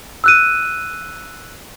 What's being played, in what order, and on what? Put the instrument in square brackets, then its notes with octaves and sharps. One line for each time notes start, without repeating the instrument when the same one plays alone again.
[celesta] E6 F#6 D#7